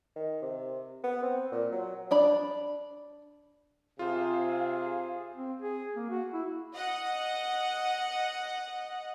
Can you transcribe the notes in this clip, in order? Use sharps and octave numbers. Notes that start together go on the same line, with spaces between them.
D#3
C3
B3
C4
A#2
F#3
D4 D5 B5
C3 F4 G#4 C5 F5
C4
G#4
A#3
F#4
E4
D#5 F#5